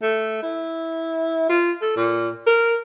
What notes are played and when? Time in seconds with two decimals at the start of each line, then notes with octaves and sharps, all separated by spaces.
0.02 A3
0.43 E4
1.49 F4
1.82 A4
1.96 A#2
2.46 A#4